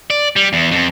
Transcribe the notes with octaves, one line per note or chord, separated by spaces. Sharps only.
D5
G3
E2
F2